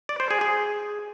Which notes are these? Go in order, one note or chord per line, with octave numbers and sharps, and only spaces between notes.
D5
C5
G#4
G#4